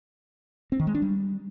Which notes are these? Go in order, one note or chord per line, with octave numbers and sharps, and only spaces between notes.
C4
D#3
G#3
D4
G3